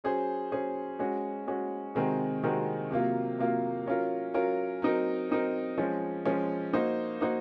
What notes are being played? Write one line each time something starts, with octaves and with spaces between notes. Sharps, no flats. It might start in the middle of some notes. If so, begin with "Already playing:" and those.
F#3 C#4 G#4 C5
F#3 C#4 G#4 C5
G#3 C#4 F#4
G#3 C#4 F#4
C3 D#3 G#3 C4 F#4
C3 D#3 G#3 C4 F#4
C3 F#3 A#3 F4
C3 F#3 A#3 F4
F#3 C#4 F4 A#4
F#3 C#4 F4 A#4
F#3 C4 D#4 A#4
F#3 C4 D#4 A#4
F3 G#3 C#4
F3 G#3 C#4
A#3 D#4 F#4 C5
A#3 D#4 F#4 C5